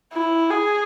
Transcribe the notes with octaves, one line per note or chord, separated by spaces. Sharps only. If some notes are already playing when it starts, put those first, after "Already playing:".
E4
G#4